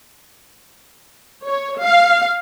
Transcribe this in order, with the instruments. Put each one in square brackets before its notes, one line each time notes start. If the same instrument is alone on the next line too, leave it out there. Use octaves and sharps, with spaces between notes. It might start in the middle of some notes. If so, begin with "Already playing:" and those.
[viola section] C#5
F5